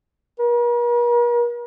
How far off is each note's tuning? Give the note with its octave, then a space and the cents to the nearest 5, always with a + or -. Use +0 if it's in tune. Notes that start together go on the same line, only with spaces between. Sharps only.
A#4 +45